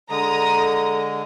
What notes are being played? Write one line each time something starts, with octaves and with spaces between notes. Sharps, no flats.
D3 G#3 A4 A#5 D#6